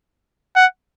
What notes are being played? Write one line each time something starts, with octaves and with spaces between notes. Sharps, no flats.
F#5